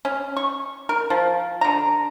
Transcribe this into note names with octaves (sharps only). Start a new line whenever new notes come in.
C#4
C#6
A#4
F3
D3 A#5